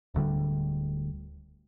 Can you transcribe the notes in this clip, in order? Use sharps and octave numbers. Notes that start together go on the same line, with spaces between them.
D1 D2 D3 G3